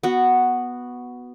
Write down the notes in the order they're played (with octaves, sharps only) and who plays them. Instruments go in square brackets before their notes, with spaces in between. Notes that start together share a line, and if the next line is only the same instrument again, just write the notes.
[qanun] B3 F#4